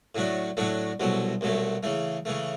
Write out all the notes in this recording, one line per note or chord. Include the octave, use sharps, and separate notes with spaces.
A2 F#3 A3 D4 F#4
A2 F#3 A3 D4 F#4
C2 B2 F#3 A3
C2 B2 F#3 A3
C#3 E3 A3
C#3 E3 A3